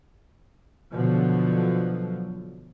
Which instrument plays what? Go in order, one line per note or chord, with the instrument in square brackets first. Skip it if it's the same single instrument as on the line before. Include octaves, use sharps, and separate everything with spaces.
[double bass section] B2 D3 F3 F#3